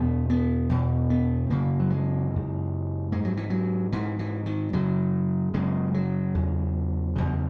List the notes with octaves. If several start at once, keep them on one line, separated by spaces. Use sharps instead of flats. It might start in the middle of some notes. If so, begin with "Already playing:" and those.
Already playing: E2 B2 B3
B3
E2 B2
B3
F#2 C#3 A#3
F#3
G#3
F#2 C#3
G#2 G#3
F#3
E3
F#3
G#2 E3
E3
D#3
F#2 C#3 F#3
F#2 C#3 G#3
F#3
E2 C#3
E2 C#3